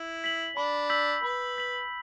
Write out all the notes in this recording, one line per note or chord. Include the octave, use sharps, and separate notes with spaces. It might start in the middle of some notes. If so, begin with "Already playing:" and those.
Already playing: E4
B6 F#7
D4 B5
E6 G6 B6 F#7
B4 B5
E6 G6 B6 F#7